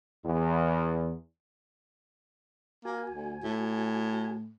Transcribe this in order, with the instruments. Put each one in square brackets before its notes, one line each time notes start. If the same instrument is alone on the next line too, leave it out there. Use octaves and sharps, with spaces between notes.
[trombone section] E2
[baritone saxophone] A#3 [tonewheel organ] F#4 G#5
[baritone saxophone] D2
A2